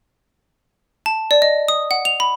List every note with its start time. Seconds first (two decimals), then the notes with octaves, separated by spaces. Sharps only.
1.06 A5
1.31 D5
1.42 D#5
1.68 D#6
1.91 F#5
2.05 F7
2.20 B5